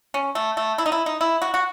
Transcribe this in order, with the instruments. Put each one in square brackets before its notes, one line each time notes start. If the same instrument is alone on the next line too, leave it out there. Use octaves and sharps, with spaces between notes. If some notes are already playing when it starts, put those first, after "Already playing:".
[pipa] C#4
A3
A3
E4
D#4
E4
D#4
E4
F#4
F#4